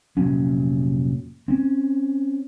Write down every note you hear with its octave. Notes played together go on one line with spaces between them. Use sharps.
F1 A#2 F#3 C#4
C4 C#4